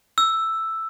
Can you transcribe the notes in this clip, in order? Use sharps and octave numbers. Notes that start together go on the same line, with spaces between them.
E6